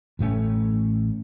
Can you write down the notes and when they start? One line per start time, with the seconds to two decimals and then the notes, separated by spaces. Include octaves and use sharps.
0.19 A1 A2 A3 C#4